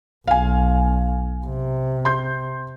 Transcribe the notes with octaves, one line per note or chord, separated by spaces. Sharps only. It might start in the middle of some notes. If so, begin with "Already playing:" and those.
B1 F5 G#5
C3
C6 G6